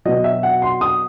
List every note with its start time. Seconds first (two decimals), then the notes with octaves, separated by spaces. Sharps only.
0.05 B2 F#3 D#5
0.24 E5
0.43 F#5
0.62 C6
0.81 D#6